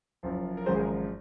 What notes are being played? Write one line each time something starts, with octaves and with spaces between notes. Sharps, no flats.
F#1 F#2 F3
A#4
G#1 F#2 F3 G#3 C5
G#4
A#4